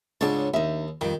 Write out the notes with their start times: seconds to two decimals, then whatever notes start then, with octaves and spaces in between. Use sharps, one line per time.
0.21 C#2 G#2 D4 C#5 A5
0.54 D#2 D#4 E5
1.01 F2 D#3 G3